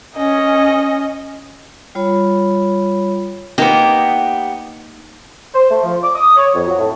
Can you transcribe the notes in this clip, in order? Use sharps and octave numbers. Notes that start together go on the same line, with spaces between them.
C#4 D#5
G3 F4 C#5 B5
A#3 B3 D#4 G4 A#4
C5
A3
F3
D6
D#6
C#5
F2
F#3
A2